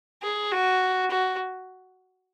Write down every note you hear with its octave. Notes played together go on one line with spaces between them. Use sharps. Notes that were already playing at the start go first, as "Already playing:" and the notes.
G#4
F#4
F#4